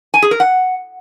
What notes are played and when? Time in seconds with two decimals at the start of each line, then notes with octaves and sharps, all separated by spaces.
0.14 G#5
0.22 G#4
0.31 A#4
0.40 F#5